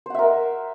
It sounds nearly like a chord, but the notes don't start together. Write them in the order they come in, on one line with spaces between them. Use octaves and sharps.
C5 F#5 E5 A#4